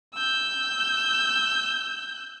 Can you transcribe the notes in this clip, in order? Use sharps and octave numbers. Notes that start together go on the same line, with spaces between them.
E6 G6